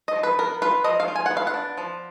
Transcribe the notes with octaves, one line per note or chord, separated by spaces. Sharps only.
D#5
F3
B4
B3 A#4
F4 B4
F3 D#5
F5
F4
G#5
F#5
B3
F5
F#5
D4
F3